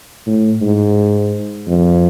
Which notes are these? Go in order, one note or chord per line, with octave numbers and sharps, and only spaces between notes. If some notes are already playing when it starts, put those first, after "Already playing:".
A2
G#2
F2